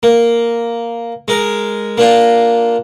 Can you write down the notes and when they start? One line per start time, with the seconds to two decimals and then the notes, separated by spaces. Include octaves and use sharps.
0.03 A#3
1.28 G#3 A#4
1.98 A#3 D4 F4